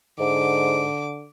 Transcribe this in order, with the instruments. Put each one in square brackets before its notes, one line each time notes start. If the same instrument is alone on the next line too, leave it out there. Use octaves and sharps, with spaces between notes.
[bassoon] G#2 [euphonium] D3 [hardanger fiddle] D6